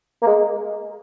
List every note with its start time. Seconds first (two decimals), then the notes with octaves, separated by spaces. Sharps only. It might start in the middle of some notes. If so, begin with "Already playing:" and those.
0.22 A#3
0.27 G#3